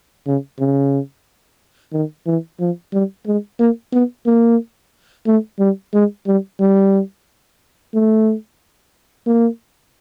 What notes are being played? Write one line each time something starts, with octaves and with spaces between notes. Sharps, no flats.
C#3
C#3
D#3
E3
F3
G3
G#3
A#3
B3
A#3
A3
G3
G#3
G3
G3
A3
A#3